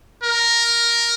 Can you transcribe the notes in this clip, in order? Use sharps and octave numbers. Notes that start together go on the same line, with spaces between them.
A#4